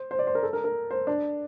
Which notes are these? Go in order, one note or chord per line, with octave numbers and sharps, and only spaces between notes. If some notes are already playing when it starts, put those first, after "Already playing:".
Already playing: C5
C5
D5
C5
A#4
A4
A#4
A#4
C5
D4